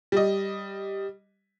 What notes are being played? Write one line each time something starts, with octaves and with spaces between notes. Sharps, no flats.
G3 D#5